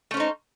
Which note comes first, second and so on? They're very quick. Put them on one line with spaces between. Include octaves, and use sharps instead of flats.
A3 C#4 C5 D#4